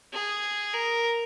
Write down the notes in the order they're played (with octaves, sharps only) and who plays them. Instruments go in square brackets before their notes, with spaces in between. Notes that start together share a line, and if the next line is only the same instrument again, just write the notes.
[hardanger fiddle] G#4
A#4